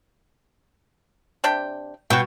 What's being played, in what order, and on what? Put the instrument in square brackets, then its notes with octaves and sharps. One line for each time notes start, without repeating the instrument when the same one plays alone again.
[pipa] C3 D4 G5
[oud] B2 [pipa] F#4 G5